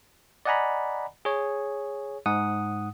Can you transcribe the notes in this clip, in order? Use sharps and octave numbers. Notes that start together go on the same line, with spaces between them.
D5 D#5 F#5 G#5 A#5 B5
G#4 C#5
G#2 F#5 D#6